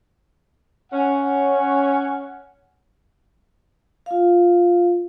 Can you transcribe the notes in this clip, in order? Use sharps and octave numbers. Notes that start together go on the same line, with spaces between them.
C#4 F#5
F4 F5